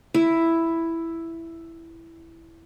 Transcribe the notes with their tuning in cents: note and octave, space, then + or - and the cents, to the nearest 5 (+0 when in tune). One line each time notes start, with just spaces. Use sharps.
E4 +5